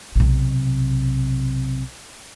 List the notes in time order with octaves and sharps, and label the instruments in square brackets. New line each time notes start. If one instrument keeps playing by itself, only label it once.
[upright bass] B1 C3